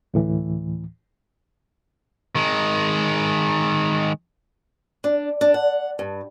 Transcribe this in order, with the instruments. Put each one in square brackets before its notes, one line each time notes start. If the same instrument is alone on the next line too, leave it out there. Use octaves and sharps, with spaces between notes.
[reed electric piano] D2 A2 E3
[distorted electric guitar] D#3 G#3
[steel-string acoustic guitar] D4
D4
F#5
G2